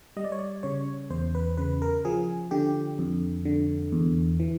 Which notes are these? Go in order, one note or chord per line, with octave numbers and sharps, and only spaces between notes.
G3 D#5
D5
C#5
D5
C#3 C#5
E2 C5
B4
C#3 B4
A#4
F3 G#4
D3 G4
F2
D3
E2
E3